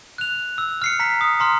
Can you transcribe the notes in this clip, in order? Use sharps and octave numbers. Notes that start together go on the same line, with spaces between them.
F#6 F7
E6
F6 C7 C#7
A#5 B6
D#6
A#5 C6 F6